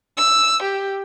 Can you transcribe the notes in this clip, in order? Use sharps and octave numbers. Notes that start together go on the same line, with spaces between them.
E6
G4